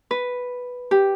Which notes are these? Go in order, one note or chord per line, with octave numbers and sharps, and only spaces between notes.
B4
G4